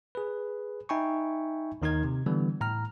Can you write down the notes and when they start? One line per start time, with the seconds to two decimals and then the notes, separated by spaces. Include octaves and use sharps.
0.15 G#4 B4
0.89 D#4 E5 G5 G#5 B5 C#6
1.82 D#2 D#3 D#4 A#4 G#6
2.04 C3
2.26 D3 E3 G3 B3
2.61 A2 A#5 F6